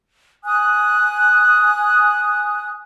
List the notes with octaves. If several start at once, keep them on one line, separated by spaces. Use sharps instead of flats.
G#5 D#6 F#6